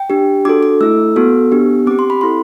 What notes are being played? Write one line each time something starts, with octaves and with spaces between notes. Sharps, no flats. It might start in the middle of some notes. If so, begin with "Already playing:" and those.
Already playing: G5
D4 G4
D4 F#4 A4 D6
D6
A3 E4 A4 E6
B3 F#4 A4
B3 D4 G4
C4 G4 D6
C6
B5
C4 E4 A4 C6